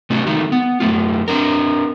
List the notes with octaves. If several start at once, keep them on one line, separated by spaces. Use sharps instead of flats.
C3 A3 C#4 F#4
D#3 G#3 A3 D#4
B3
F#2 D#3 A3 F4
C4 D4 A#4